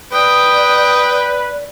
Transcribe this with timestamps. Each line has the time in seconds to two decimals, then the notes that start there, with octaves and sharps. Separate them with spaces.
0.13 B4 D5 G5 D#6